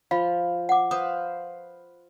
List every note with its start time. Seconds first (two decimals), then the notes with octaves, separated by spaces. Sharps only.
0.11 F3 F5 B5
0.69 F#5 D6
0.91 B4 C5 F5 D#6